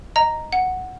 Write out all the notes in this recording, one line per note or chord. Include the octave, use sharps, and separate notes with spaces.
D#5 A#5
F#5